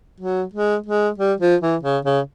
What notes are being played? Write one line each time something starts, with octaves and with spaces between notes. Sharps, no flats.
F#3
G#3
G#3
G3
F3
E3
C#3
C#3